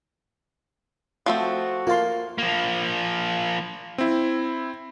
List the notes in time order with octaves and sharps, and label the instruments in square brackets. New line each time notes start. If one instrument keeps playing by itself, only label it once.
[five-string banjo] F3 A3 C4 [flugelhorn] F#4
[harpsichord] A#3 A5 [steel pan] F4 F5 C6
[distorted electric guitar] F3 A#3
[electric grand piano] C4 E4